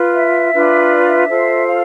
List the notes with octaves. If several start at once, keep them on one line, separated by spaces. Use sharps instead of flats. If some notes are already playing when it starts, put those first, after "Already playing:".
Already playing: F4 B4
E5
D4 F4 B4
D5
E5
F4 A4 C5
F5